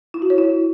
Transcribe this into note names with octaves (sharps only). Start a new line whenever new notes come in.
E4
F#4
C#5
E4